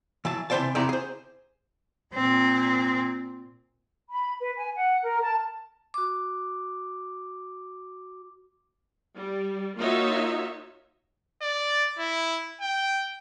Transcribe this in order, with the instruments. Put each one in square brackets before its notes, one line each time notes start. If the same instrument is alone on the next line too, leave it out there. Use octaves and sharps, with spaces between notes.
[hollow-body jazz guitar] E3 F#3 A5
C3 E3 F3 C5 D5 A5
E2 C3 D#4 E4 D5 A#5
G#4 C5
[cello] A#2 C4
[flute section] B5
B4
G#5
F#5
A#4
A5
[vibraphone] F#4 D6
[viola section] G3
A#3 D#4 F4 F#4 C#5 E5
[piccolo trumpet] D5
E4
G5